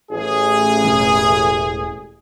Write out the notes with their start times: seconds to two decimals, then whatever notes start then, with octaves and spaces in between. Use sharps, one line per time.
0.11 A1 G#4
0.84 E1